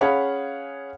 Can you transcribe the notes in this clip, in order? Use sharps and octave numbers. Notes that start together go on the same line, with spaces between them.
C#4 G#4 C#5 F5 F#5 B5